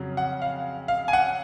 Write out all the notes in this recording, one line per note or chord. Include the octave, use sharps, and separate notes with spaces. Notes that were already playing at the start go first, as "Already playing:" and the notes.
Already playing: F2 C#3 F#3
F#5
F5
F5
G#5
F#5